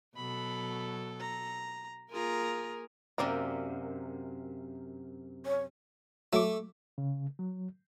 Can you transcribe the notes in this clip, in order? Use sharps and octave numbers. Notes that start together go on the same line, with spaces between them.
B2 F#3 A4 B5
A#5
A#3 F4 G#4 A#4 A#5
F#2 C3 A#3 C4 D5 A#5
C#5
F#3 A3 D6
C#3
F#3